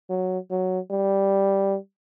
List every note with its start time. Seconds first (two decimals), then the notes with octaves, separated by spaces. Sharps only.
0.10 F#3
0.51 F#3
0.91 G3